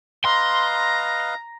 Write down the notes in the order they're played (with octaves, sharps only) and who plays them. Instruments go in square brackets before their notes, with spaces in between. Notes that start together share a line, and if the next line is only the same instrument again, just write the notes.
[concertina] B4 D#5 F5 [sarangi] A#5 [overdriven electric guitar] C6